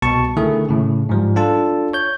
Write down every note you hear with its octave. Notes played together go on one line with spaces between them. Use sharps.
C2 B2 A5 C#6
D3 D#3 A3 E4 G#4
A2 C#3
G#2 F3 G3
D4 F4 A4 A5
C#5 G6